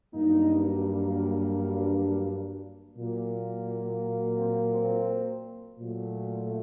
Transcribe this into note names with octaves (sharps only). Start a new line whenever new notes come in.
G2 F#3 A#3 D#4
D4
A#2 F#3 A#3
C4
C4
A#2 F#3 A3